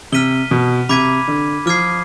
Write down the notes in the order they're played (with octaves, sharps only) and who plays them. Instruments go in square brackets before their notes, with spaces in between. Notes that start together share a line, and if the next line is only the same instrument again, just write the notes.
[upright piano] C3 [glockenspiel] F6 B6 D#7 G7
[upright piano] B2
[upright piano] C3 [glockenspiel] B5 D6 G#6 B6 D#7
[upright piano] D3
[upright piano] F3 [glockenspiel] D6 F6 G#6 C7